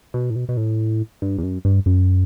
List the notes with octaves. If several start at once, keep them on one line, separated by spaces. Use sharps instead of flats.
B2
A2
B2
B2
A2
G2
E2
F#2
G2
F#2